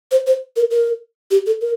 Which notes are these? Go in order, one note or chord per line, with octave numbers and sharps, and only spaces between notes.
C5
C5
A#4
A#4
G4
A4
A#4